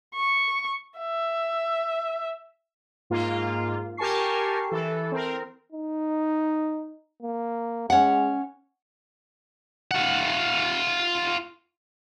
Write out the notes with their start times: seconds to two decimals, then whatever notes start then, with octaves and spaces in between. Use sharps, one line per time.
0.15 C#6
0.99 E5
3.10 G#2 A#3 F4
3.97 G4 A#4 G#5 A5 C#6 C7
4.69 E3 A4
5.12 C4 A#4
5.73 D#4
7.23 A#3
7.90 G#3 C#4 F#5
9.91 F4 F#5